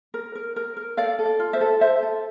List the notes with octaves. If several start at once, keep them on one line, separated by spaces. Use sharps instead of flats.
A#4
A#4
A#4
A#4
A4 D5 F5
A4
D5
F4
C5 E5
A4
A4 C5 E5
A4